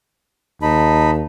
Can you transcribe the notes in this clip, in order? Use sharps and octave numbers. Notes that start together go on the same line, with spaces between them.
D#2 D#4 A5 B5